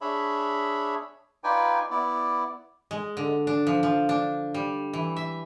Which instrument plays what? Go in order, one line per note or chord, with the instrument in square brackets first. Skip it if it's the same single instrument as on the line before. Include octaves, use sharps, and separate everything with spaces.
[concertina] D4 G#4 C#5 E5 B5
D#4 F4 B4 D5 G5 G#5
B3 E4 D5
[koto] G#3
D3
D4
F3
F3
D4
G3
E3
E5